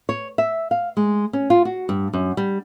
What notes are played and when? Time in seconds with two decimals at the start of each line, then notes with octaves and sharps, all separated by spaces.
0.09 C#5
0.38 E5
0.71 F5
0.97 G#3
1.33 C#4
1.50 F4
1.65 F#4
1.89 G2
2.13 F#2
2.37 G3